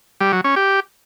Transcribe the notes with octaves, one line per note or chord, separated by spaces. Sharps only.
G3
F#3
C#4
G4